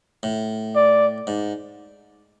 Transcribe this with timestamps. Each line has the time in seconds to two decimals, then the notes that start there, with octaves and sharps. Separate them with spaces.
0.23 A2
0.76 D5
1.27 G#2